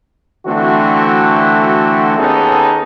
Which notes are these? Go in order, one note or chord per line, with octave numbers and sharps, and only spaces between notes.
D3 E3 A3 C4 F#4
D#2 B3 C#4 D#4 G#4 A4